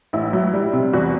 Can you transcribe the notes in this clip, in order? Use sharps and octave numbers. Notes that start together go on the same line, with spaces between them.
A1 E4
F#3
G3
C3
E2 F#4